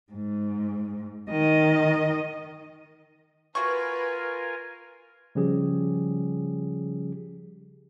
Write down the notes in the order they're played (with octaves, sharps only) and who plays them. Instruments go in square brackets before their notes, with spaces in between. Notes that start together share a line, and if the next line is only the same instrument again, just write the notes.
[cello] G#2
D#3 D#5
[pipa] C3 F#4 C#6 [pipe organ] F4 A#4 G#5 [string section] B4
[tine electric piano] C#3 F3 G3 C#4 G4 G#4